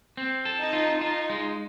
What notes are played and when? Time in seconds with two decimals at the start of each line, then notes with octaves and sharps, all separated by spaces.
0.17 C4
0.45 A4
0.59 D#4
0.73 F4
1.01 D#4 F4
1.30 G#3